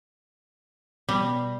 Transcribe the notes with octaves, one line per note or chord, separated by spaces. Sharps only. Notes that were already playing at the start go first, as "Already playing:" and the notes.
B2 G3